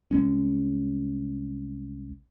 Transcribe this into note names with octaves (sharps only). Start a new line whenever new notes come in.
C2 G#3 C#4